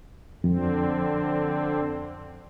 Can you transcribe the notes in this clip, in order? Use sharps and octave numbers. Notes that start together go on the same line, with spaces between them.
F2 D3 C4